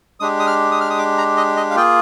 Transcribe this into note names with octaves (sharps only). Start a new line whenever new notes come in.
G#3 D4 G4 D#6
D#6
F6
D#6
F6
D#6
D6
A#5
D#5
D#5
F5
A#3 F4 G#4 G5